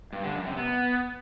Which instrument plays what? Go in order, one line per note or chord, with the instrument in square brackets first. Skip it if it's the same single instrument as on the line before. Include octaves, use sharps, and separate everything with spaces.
[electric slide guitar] G2
D3
F#2
C3
B3